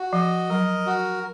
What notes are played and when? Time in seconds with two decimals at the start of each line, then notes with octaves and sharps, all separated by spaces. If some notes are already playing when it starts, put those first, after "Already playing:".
Already playing: F#4
0.13 F3 D#5
0.50 F#3 A#4
0.86 F#4